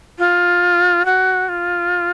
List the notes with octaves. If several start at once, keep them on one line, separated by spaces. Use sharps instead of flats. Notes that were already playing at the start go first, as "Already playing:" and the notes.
F4
F#4
F4